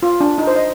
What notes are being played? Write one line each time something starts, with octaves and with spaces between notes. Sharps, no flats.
F4
D4
D#4
C5
D#5